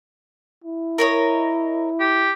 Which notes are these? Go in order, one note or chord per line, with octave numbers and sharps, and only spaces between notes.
E4
A#4 C#5 D#5
G4